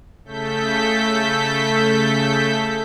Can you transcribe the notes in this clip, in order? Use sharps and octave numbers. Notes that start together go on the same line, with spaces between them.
C#3 A3 A4 G6 B6